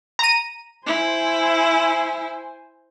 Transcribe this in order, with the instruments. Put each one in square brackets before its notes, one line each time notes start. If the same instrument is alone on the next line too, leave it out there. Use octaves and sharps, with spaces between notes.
[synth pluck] A#5 D#7
[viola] E4 [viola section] C5 G#5